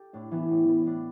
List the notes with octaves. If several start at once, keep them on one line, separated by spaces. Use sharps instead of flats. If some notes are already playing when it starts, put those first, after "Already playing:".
Already playing: G4 A4
A2 D4
E3 B3
A2
E3 B3
A2 D4